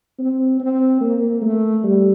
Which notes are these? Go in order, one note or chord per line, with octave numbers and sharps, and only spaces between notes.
C4
C4
A#3
A3
G3